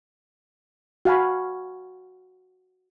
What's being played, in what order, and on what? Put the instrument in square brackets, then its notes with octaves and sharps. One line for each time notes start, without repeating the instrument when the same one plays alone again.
[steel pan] F#4 F5 G#5 B5